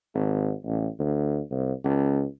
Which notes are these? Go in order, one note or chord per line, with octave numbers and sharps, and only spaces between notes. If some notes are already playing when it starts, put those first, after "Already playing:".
G#1
A1
D2
C2
C#2